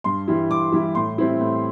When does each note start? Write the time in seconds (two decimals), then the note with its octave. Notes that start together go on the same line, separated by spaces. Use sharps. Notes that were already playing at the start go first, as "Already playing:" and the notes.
0.04 G2 C6
0.28 E3 G3 E4
0.50 G2 D6
0.72 E3 G3 E4
0.95 A2 C6
1.18 G3 C4 E4
1.41 A2